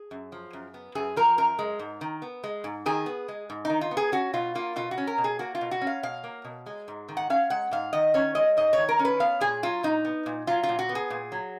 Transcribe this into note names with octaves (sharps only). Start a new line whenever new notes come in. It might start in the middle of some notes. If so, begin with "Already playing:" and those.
Already playing: G#4
F#2
F3
F#2
B3
F#2 G#4
F3 A#4
F#2 A#4
G#3
G#2
D#3
B3
G#3
G#2
D#3 G#4
B3
G#3
G#2
D#3 D#4
F4
B3
G#4
C#4 F#4
B2 F4
A#3 F4
B2 F4
F#4
C#4
A#4
B2
G#4
A#3 F#4
F4
B2
F#4
C#4
F5
B2 F5
A#3
B2
G#3
G#2
D#3
F#5
C#4 F5
G#3 F#5
G#2 F5
D#3 D#5
C#4 C#5
G#3 D#5
G#2 D#5
D#3 C#5
A#4
C#4
B4
B3 F5
A#2 G#4
F#3 F4
A#2 D#4
B3
A#2
F#3 F4
F4
A#2
F#4
B3
G#4
A#2
F#3